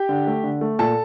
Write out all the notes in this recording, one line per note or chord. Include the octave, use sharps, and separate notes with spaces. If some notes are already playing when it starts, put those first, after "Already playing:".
Already playing: G4 G5
D3
A3
D3
A3
A#2 A4 A5